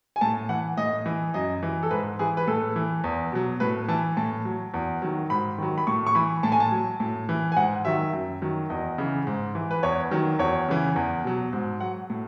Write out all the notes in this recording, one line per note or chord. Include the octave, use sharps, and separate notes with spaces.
G#5
A2 A5
E3 F#5
A2 D#5
E3
F#2 D#5
E3
A4
G#2 B4
E3 G#4
B4
A2 A4
E3
E2
B2 F#3
A2 B4
E3 A5
A2 A5
F#3
E2
D#3 F#3
G#2 B5
D#3 F#3
B5
A2 C#6
C#6
E3 B5
A2 A5
G#5
A5
F#3
A2
E3
G#5
G#2 F#5
D#3 F#3 E5
F#2
D#3 F#3
E2 D#5
C#3 E3
G#2
E3
B4
E2 C#5
D#3 F#3
E2 C#5
C#3 E3
E2
B2 F#3
G#2
F#3 F#5
A2